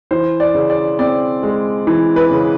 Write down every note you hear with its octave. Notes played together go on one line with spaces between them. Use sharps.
E3 C5
D5
C#3
D5
C4 D5
G#3
E3
B4
C#3